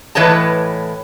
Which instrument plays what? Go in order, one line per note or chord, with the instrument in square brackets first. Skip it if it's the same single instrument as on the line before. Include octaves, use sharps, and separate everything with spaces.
[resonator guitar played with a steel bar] A2 E3 B4 C#5 D#5 A5